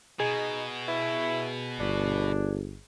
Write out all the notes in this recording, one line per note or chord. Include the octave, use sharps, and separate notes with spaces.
B2 D#4 G#4
E4
G1 D4